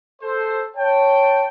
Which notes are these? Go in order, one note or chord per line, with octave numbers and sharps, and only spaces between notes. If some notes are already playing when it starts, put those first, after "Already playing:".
A4 C5
C#5 G5 A5